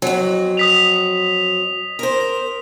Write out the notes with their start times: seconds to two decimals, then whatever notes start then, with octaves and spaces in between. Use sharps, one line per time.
0.02 F2 F#3
0.57 D#6 B6 F7
1.99 A#4 C5